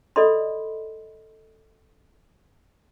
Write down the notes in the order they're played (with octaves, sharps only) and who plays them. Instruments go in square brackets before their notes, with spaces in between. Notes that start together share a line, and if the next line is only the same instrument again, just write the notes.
[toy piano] A4 D5 D#5 B5 C6